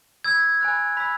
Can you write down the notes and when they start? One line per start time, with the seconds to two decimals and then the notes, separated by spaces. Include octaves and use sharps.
0.24 B5 E6 G#6
0.61 G#5 B5 F#6
0.97 B5 E6 B6